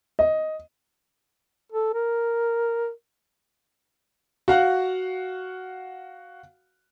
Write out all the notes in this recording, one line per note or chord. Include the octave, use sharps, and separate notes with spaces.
D#5
A4
A#4
F#4 F5 F#5